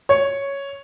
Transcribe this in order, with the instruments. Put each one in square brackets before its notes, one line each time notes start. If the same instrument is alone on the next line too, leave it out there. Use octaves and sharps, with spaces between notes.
[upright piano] C#5